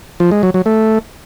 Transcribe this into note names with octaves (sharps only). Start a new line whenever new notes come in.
F3
G#3
F#3
F#3
A3